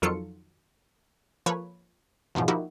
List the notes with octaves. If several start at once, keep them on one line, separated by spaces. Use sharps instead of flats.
F2 D#3 F#3 F4 A4 C#7
F3 A#3 A4 B4 C#5
E2 G#2 B2 F3
F3 A#3 D#4 E4 F#4 G4